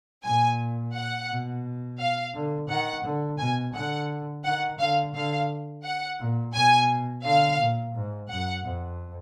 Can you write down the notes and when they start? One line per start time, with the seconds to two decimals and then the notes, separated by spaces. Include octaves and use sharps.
0.24 A#2 G#5
0.93 F#5
1.29 B2
1.99 F5
2.33 D3
2.69 D#3 F#5
3.05 D3
3.39 B2 G#5
3.74 D3 F#5
4.44 D#3 F#5
4.79 D3 F5
5.14 D3 F5
5.84 F#5
6.19 A#2
6.54 B2 G#5
7.24 D3 F5
7.59 A#2
7.94 G#2
8.29 F#2 F#5
8.65 F2